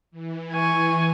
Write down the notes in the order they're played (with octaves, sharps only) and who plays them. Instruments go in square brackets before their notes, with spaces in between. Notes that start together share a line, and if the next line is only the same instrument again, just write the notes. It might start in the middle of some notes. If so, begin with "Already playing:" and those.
[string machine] E3
[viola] G#5 C#6